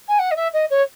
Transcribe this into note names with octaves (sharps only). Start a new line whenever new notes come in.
G#5
F#5
D#5
E5
D#5
C#5